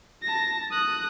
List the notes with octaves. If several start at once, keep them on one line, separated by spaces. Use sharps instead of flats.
A5 A#6
D#6 F#6